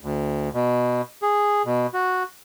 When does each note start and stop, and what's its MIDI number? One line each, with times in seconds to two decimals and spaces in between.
0.01 0.49 38
0.54 1.02 47
1.22 1.62 68
1.66 1.87 47
1.93 2.23 66